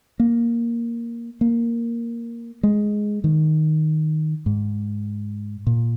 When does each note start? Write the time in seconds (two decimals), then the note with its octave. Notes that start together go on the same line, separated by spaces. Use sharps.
0.20 A#3
1.41 A#3
2.63 G#3
3.24 D#3
4.46 G#2
5.67 A#2